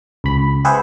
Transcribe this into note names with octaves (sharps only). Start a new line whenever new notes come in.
C#2 B5
G4 G#4 B4 C5 E5 F#5